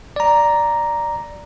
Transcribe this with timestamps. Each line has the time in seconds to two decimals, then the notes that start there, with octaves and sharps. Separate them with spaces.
0.16 D5 A#5